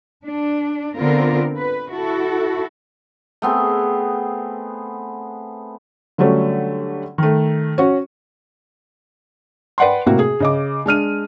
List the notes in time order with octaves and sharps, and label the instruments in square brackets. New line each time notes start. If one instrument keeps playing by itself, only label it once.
[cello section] D4
D3 B3 C4 F4 A#4
B4
E4 F#4 A4
[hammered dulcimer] A3 B3 C4 G#4
[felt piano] D3 F#3 G3 A3 C#4
D#3 A3
C#4 F#4
B4 D5 F#5 G5 C6
A2 C3 A#3 F#4
G#4
C#3 D#5 D6
G#3 D4 F6 D#7